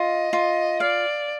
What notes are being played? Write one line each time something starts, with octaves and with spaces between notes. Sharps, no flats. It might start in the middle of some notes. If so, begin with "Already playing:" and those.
Already playing: F4 D#5
F4
D5 F5